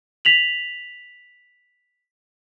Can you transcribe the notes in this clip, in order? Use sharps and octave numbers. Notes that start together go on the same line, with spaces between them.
B6 F7 F#7